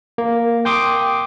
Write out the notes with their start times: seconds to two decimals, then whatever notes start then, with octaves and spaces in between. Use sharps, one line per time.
0.18 A#3
0.65 G5 C6 D6 D#6